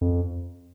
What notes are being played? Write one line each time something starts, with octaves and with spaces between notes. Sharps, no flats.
F2